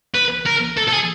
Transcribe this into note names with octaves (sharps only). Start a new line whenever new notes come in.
B4
A#4
A4
A4
G#4